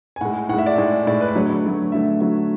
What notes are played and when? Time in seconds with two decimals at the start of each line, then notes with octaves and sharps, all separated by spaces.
0.16 G#5
0.21 A2 G#3 F#5
0.49 A2 F#5
0.53 G#3
0.59 E5
0.66 D5
0.76 A2 G#3 E5
1.07 A2 G#3 D5
1.21 B4
1.28 D5
1.35 D3 F#3 A3 C#5
1.64 D3 F#3 A3
1.92 D3 F#3 A3 E5
2.21 D3 F#3 A3